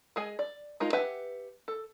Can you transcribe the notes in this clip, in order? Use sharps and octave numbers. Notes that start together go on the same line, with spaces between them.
G#3 G#4 G#5
D5
G#3 D#4 F4 A#4
G4 B4 E5 F#5 G#5
A4